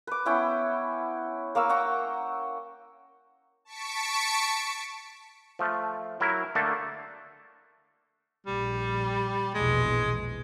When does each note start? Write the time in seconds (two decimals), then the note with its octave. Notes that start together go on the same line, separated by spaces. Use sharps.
0.07 B4 D6
0.26 B3 C#4 E4 G5
1.55 A#3 F5 C#6 E6
1.69 F#5 G5 A#5 C#6
3.65 A5 C#6 B6 C#7 D7
5.59 F3 A3
6.20 F#3 E4 A#4 A#5
6.55 D3 A3 A#3 A4
8.47 A#1 G3
9.54 A#1 E2 B2 G#3